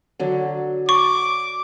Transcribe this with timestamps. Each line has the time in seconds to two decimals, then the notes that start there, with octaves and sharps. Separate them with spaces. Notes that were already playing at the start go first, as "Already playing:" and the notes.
0.20 D3 F#3
0.89 C#6 D6